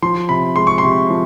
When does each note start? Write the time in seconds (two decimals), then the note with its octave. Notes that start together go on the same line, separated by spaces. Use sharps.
0.02 F3 C6
0.29 C3 B5
0.56 G#3 C6
0.67 C#6
0.78 C3 C6
1.10 F3